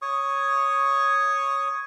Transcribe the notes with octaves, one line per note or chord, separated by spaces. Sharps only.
C#5 C#6 D#6